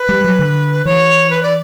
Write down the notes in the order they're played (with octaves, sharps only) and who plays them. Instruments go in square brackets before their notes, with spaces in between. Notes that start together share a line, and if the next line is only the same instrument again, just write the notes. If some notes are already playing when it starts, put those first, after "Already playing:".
Already playing: [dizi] B4
[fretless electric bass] G3
F#3
D3
[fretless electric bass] E3 [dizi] C#5
[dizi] B4
D5